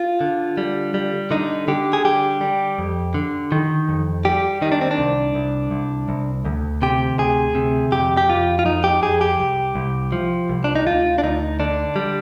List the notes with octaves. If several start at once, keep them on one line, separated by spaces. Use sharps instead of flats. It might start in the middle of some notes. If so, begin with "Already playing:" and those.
Already playing: F4
D3
G3
G3
D3 D#4
D3 G4
G#4
G3 G4
G3
F2
D3
D#3
F2
G3 G4
D#3 D#4
D4
C4
D4
C2
C2
C2
C2
D2
C3 G4
D2 G#4
C3
F2 G4
G4
F2 F4
F4
F2 D#4
G4
F2 G#4
G4
C2
C2
F3
C2
D4
D#4
D2 F4
D4
D2 D#4
D3 D4
G3